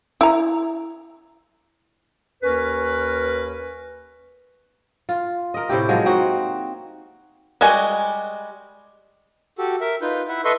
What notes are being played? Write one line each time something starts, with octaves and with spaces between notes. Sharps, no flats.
E4 A#5
D#2 C#4 A#4 B4
F4
A#4 D#5
A2 C3 E4 G4
F3 F#3 G#3 A#3
C4 D#4 F#4
G3 G#3 F#4 G#5
F#4 G4 A4
A#4 E5
D#4 F4 B4 G6
E4 E5 F#5
A4 B4 D#5 E5 C6 C#6